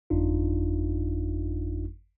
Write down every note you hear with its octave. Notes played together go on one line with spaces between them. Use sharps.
G1 F2 D4 D#4 F4